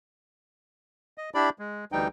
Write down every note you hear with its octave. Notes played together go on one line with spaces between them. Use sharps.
D#5
D4 E4 G4 D5 B5
G#3
D2 E3 G3 D#4 G5